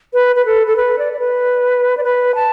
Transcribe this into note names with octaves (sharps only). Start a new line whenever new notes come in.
B4
B4
A4
A4
B4
D5
D5
B4
D5
B4
A5